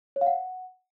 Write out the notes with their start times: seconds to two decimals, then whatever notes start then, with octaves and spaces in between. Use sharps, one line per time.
0.16 C#5
0.21 F5
0.27 F#5